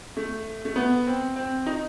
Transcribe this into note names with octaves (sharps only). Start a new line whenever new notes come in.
A3
A3
B3
C4
C4
D#4